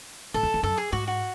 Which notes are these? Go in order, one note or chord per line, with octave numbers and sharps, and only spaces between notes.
A2 A4
E2
E2
F#2 A4
G#4
G#2 F#4
F#4